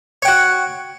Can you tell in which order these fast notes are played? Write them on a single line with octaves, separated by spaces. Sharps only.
C#5 G5 F#4